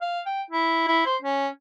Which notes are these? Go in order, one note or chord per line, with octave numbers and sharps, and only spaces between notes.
F5
G5
E4
E4
C5
C#4